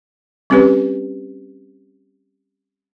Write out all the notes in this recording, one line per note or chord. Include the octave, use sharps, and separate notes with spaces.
G3 C4 C#4 G4 B4 C#5